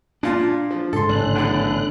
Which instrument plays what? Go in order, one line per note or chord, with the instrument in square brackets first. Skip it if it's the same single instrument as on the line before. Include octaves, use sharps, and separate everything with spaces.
[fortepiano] A#2 F4 A5 [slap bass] D4
[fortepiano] F3
[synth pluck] G#2 C#3 [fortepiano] A4 C6
[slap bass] A1 [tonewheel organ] D3 F#6
[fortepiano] F#2 B2 A4